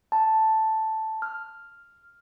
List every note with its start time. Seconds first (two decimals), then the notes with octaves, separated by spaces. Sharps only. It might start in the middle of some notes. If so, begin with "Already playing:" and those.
0.12 A5
1.22 F6